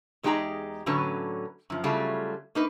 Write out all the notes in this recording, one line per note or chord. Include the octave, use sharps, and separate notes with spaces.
E2 G#3 D#4 G4 G#4 A#5
A2 D3 F#3 C#4 B4
F#2 F3
C#3 F#3 G3 A3 F4
A#3 D#4 B4